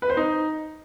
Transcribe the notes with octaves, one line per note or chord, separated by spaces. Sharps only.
B4
C5
D#4